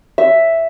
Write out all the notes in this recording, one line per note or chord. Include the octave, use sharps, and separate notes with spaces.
E5